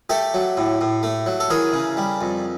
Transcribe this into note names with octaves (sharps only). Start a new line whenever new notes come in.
A3 G4 A4
F#3
A2
A2
A3
F#3
A4
E3 G#4 A#4
C#3
G3
F2